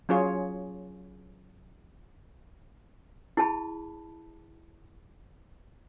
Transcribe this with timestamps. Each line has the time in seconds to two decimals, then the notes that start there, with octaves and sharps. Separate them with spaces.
0.09 F#3 C#4 F4 G#4 C#5
3.37 E4 G#4 A5 B5